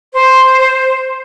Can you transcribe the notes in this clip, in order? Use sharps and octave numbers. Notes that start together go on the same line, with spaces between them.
C5